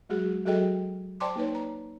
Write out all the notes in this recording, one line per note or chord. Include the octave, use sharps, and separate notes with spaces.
F#3 G#3 F#4 G#4
F#3 F#4 G#4 A4 D#5 G5
C5 D5 G5 A5 C6 D6
A#3 D#4 B4 C#5
A#5